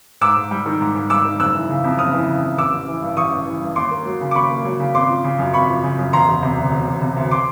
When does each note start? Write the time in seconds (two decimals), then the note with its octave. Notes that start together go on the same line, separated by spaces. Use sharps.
0.21 G#2 D6 E6
0.36 G#2
0.51 G3
0.66 D#3
0.81 G#2
0.95 G#2
1.10 G3 D6 E6
1.25 D#3
1.39 F#1 E6 F#6
1.55 E3
1.70 C#3
1.84 F2
1.98 F#1 D#6 F6
2.13 E3
2.28 C#3
2.43 F2
2.58 A1 D6 E6
2.73 A1
2.88 E3
3.02 G2
3.17 A1 C#6 D#6
3.32 A1
3.46 E3
3.61 G2
3.76 D#2 C6 D6
3.91 A#3
4.06 F#3
4.21 C#3
4.31 D6
4.35 D#2 B5 C#6
4.50 A#3
4.65 F#3
4.80 C#3
4.94 G#1 C6 D6
5.09 F3
5.24 C#3
5.38 F#2
5.53 G#1 B5 C#6
5.69 F3
5.83 C#3
5.98 F#2
6.13 E1 A#5 C6
6.28 E1
6.43 C3
6.57 D2
6.72 E1
6.87 E1
7.02 C3
7.16 D2
7.31 C6 D6